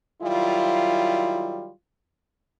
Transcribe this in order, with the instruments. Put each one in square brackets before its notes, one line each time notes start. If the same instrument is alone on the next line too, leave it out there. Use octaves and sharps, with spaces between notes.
[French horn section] D#3 F#3 G3 E4 F4